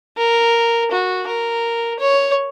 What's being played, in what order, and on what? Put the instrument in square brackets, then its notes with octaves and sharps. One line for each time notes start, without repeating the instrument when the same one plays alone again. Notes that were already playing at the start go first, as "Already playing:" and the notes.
[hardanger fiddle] A#4
F#4
A#4
C#5